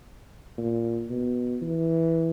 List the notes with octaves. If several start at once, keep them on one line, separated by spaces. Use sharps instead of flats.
A#2
B2
E3